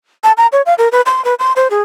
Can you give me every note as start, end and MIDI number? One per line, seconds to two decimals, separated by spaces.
0.24 0.32 81
0.37 0.47 82
0.52 0.62 73
0.66 0.74 77
0.78 0.88 70
0.92 1.01 71
1.06 1.24 84
1.25 1.34 71
1.39 1.52 84
1.56 1.68 72
1.70 1.82 68